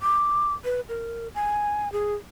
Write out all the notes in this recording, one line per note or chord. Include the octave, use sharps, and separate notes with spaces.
D6
B4
A#4
G#5
G#4